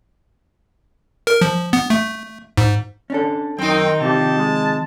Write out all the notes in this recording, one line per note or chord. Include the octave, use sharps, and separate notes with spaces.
A#4
F3
B3
A3
G#2
C#4 D4 A4
F#2 D#3 C4 D#4 G5
C3 D#3 F3 G4 A5
G#3